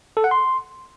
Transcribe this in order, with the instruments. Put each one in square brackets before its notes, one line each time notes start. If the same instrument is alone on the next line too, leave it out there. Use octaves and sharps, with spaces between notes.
[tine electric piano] A4
F#5
C6